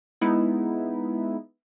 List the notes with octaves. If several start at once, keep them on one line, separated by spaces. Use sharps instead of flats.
G#3 B3 D#4 E4